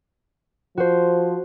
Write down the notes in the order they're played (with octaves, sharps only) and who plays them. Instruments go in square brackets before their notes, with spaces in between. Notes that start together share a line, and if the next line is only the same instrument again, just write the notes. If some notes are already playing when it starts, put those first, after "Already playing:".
[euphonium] F3 [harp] F#4 C5